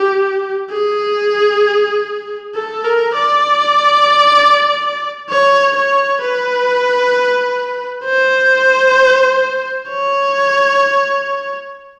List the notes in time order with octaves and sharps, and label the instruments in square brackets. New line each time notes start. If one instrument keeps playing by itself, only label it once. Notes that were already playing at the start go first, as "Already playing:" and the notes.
Already playing: [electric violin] G4
G#4
A4
A#4
D5
C#5
C#5
B4
C5
C#5